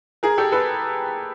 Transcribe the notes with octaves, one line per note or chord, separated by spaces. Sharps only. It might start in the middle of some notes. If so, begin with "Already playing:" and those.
G#4 A#4
G4 A4
A4 B4